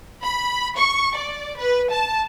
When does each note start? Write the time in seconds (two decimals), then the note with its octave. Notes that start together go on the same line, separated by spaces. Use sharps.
0.24 B5
0.77 C#6
1.17 D5
1.58 B4
1.92 A5